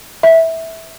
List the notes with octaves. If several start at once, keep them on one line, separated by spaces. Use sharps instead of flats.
E5